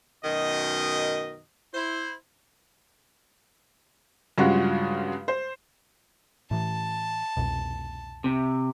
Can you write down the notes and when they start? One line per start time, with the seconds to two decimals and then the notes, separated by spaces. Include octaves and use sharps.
0.25 F#2 B2 D#3 D#5
1.75 E4 C5
4.38 G2 C#3 F#3 G#3 F4 F#4
5.28 C5
6.51 A2 E3 A5
7.37 C2 F2 B2
8.24 C3